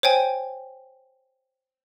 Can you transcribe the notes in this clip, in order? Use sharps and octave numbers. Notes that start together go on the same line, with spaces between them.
C5 C#5 G5 G#5